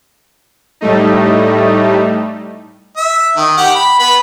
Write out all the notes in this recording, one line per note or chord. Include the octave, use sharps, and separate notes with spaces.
A2 G3 A3 D#4
E5
D#3
G4 F#5
B5
B3 B5